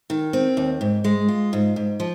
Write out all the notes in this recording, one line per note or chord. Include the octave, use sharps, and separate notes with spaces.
D#3
C4
D#2
G#2
G#3
F4
G#2
G#2
F3